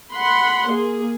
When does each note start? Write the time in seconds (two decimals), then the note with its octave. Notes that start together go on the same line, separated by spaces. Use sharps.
0.14 F#5 B5 C6
0.69 A#3 G#4